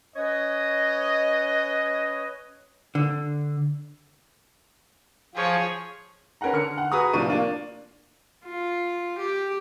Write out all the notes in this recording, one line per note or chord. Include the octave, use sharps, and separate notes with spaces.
C#4 B4 C#5 D#5
D3
F3 G#4 C#5
C#4 A#4 B4 F#5 A#5
D3 F6 C#7
F#5
F#4 G#4 B4 A#5 D#6
A2 C3 F3 D4 C#6 D#7
A#3 D4 F4
F4
G4